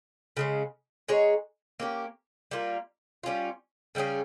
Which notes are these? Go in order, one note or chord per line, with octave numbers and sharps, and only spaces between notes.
C#3 G#3 C#4
G#3 D#4 G#4 C#5
A#3 C#4 G4
G3 A#3 F4
G3 C#4 F4
C#3 G3 C#4 G#4